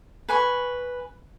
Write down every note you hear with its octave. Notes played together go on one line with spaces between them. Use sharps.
B4 G#5 C#6